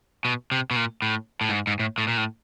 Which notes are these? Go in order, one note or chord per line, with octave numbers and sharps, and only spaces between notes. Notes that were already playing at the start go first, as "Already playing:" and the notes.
B2
C3
B2
A#2
A2
A2
G#2
G#2
A2
A2
A#2
A2